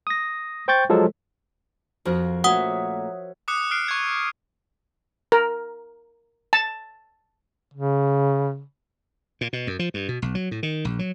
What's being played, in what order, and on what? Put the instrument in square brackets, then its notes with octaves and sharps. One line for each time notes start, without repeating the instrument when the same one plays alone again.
[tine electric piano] D#6 A#6
C5 G5 C#6 G6 A6
F3 F#3 G#3 A4
[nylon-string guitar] F2 [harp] F3 F#4 A#4
[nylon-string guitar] A#2 A3 C#4 [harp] F#4 C#5 E5 [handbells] F#5 D#6
[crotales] D6 D#6 F#6 C#7
F6 F#6 C7 D7
C#6 G#6
[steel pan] A#4
A5
[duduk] C#3
[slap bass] A#2
B2
F#2
F3
G2
B2
B1
F#3
A2
D#3
A#1
F#3